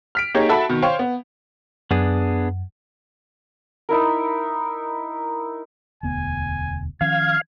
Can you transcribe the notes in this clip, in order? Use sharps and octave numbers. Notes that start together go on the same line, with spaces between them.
F6 B6 D7
A#3 D#4 G4 G#4 C#5
F#4 A4 E5 A5 B5
B2 D#3
C5 C#5 F5 G5 C#6
B3
F#2 B3 D4 G#4
D#4 E4 A#4
E1 D2 B3 G#5
D#3 F3 C#4 F5 G#6